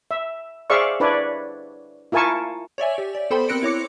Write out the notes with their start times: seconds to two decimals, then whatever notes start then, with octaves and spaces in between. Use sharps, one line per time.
0.11 E5
0.70 G#4 C5 D5 E5 F5 C#6
1.00 D4 E4 B4 C#5 D5
2.12 E4 F4 A#4 G#5 A5 C#6
2.78 C#5 D5 E5 G#5
2.98 G4
3.15 D5
3.30 B3 A4 C5 G5 B5 C6
3.49 C4 A#4 F#6 A#6 C#7 D7
3.63 E4 C#5 D6 C#7